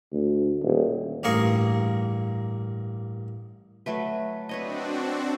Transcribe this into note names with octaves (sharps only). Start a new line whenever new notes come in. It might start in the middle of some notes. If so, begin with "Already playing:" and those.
D2
D#1
A1 G2 A#3 G#4 A#4 C#6
F#3 A3 B4
C4 D4 F#4 B4 C#5 D#5